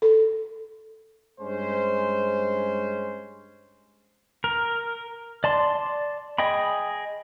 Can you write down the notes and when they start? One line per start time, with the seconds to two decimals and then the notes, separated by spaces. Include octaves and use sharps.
0.02 A4
1.41 G2 G#3 C#4 C5
4.44 A#4
5.44 D5 A5 C6
6.38 G#4 D#5 G5 B5